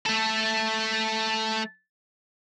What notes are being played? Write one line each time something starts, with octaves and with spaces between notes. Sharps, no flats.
A3 A4